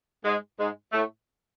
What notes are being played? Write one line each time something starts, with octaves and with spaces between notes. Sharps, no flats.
G#2 G#3
G#2 G#3
A2 A3